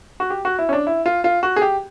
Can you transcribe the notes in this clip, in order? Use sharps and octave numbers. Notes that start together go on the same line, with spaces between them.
F#4
G4
F#4
E4
C#4
D4
E4
F4
F4
F#4
G#4
G4